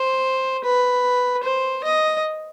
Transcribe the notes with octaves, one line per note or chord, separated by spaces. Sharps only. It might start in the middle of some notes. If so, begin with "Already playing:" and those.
Already playing: C5
B4
C5
D#5